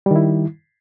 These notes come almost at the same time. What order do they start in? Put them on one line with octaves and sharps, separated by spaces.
G3 D#3 E4